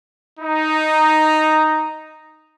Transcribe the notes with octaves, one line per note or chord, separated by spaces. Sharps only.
D#4 A#5